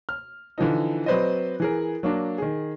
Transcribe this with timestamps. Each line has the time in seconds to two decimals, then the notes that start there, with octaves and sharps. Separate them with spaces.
0.09 F6
0.58 D3 E3 F3 D#4
1.06 F#3 C4 B4 C5 D5 D#5
1.60 E3 G#4 A#4
2.03 F#3 A#3 D4
2.38 D#3 G#4